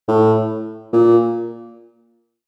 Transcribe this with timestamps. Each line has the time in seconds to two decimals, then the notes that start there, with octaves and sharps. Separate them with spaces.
0.08 A2
0.93 A#2